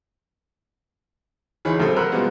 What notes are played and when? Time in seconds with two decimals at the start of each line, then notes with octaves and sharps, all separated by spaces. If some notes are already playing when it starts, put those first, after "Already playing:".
1.65 D2 E3 D#4 G#4 C#5 B5
1.79 D#1 A#1 C3 F#3 A4 C5
1.96 A#4 C5 F#5 B5 E6 F#6
2.12 B2 F3 G3 G#3 A#3 B3